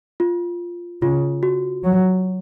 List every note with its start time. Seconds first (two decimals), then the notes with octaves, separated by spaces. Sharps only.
0.20 F4
1.02 C#3 F4
1.43 F#4
1.84 F#3